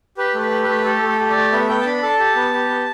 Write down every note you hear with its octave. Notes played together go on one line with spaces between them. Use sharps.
G4 B4
A3
B4
G4
A3 B4
G4 A4
A3
A4
G4
D5
A3
B3 E5
B3 G5
A5
D4 B5
A4 A5
G4
B3
G4
B3